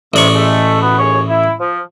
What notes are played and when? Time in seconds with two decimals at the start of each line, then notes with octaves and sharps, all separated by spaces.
0.14 A1 G#2 C3 D5 C#6
0.34 G#3 A3
0.81 B2 B3
0.98 D#2 G#4 C#5
1.29 E4
1.59 F3